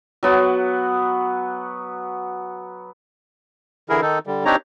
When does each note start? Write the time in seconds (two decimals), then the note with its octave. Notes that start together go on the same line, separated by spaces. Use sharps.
0.23 F#3 B3 F#4
3.89 D3 E3 E4 G#4 A#4
4.02 D#3 D#4 A4
4.27 D3 G3
4.45 C4 D4 D#4 G4 C#5 A#5